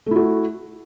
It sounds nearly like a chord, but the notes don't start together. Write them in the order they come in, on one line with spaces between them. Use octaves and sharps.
A3 E4 F#4